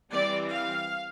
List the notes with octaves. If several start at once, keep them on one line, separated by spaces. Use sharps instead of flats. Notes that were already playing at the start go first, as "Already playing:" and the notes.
E3 G3 C4 D5
F5